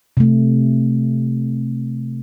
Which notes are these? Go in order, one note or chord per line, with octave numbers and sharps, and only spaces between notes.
C3 A3